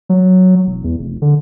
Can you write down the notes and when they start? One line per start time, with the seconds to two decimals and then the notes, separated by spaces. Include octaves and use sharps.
0.09 F#3
0.67 E1
0.84 E2
0.99 F1
1.22 D3